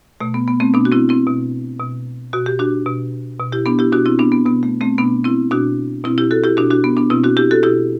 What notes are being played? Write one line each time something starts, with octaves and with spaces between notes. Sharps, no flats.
B2 A3
B3
B3
A3 C4
B2 B3 D4
F#4
C4 E4
C4 E4
B2
B2
B2 F#4
G4
D4 F#4
B2
B2
E4 G4
B3 D4
E4 G4
B2 D4 F#4
C4 E4
B3 D4
B3
B2 B3
A3
A3 C4
B2 B3 D4
C4 E4
B2 D4 F#4
B2 C4 E4
E4 G4
F#4 A4
E4 G4
B2 D4 F#4
D4 F#4
B3
B3 D4
B2 C4 E4
D4 F#4
E4 G4
F#4 A4
B2 E4 G4